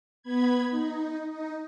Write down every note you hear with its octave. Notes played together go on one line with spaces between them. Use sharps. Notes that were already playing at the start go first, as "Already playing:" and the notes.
B3 B5 G#6
D#4
D#4